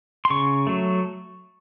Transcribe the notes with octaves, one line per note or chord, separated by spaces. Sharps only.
C6
C#3 C#6
F#3 A3